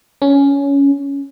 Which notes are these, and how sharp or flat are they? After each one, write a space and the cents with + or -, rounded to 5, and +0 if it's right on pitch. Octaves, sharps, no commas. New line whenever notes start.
C#4 +10